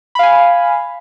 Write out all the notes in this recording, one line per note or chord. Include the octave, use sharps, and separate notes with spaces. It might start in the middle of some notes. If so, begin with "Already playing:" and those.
F5 G#5 B5